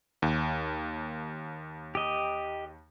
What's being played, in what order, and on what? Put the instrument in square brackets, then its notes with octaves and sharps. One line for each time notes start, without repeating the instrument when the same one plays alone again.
[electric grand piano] D#2
[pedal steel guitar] G4 D#5